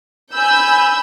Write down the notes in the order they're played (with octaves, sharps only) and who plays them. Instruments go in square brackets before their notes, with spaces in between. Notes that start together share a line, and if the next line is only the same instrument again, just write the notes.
[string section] G#5 B5 E6 G6